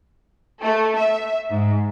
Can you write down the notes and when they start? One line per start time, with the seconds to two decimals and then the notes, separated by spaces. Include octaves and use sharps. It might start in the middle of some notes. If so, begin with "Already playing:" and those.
0.61 A3
0.97 E5
1.50 G#2